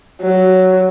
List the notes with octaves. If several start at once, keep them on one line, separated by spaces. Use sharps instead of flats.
F#3